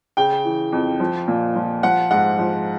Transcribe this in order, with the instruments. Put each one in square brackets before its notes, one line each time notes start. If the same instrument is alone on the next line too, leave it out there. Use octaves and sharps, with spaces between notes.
[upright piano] C#3 G5
E3
F2
F3
A#2
F3
F3 F#5
G#2 F#5
F3